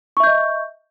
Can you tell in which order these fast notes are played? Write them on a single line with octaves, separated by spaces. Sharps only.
C#6 E5 G6 D#5